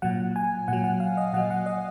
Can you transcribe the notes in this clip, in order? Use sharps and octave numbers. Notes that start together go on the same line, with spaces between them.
A#2 F#3 F#5
G#5
A#2 F#3 F#5
F#5
F5
D#5
A#2 F#3 F#5
F#5
D#5